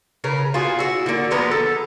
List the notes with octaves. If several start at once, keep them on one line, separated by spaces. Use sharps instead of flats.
C#3 A#4 B4
F4 F#4 G#4
E4 F#4
D3 A#3
F3 G#3 B3 A#5
A4